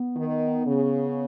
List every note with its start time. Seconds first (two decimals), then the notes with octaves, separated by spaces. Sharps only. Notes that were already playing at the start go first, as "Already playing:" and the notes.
Already playing: B3
0.17 D#3
0.67 C#3